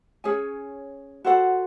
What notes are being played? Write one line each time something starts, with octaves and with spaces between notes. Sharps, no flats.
C#4 G#4 C#5 G#5
F#4 A4 C5 F#5